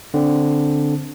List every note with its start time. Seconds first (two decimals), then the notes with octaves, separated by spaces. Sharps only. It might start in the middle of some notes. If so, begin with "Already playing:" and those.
0.14 D3 C4 D4